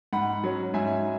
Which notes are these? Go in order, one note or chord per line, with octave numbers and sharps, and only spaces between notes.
G#2 F#5 B5
F#3 C#4
G#2 E5 G#5